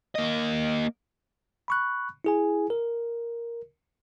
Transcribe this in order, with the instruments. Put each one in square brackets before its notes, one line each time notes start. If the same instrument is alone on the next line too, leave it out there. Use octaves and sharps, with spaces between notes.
[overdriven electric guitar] A#3 D#5
[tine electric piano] B5 C#6 F#6
E4 G#4 G#5
A#4